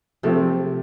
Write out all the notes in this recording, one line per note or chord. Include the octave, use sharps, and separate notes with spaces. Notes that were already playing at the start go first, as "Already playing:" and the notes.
C3 F3 A3 C4